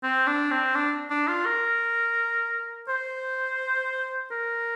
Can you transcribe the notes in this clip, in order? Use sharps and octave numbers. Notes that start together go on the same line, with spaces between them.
C4
D4
C4
D4
D4
F4
A#4
C5
A#4